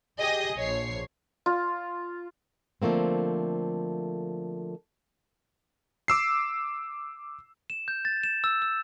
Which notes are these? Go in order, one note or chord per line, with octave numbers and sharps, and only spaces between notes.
G4 G#4 D#5
A#1 C#5 C7
F4
D3 F3 A3 A#3 C4
D6 E6 C7
E7
G6
A6
E7
E6
E6